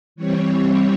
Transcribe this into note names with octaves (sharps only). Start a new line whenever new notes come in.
E3 G3 C4 C#5